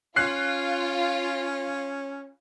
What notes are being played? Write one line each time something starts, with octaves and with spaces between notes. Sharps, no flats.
C#4 F4 F#6 C7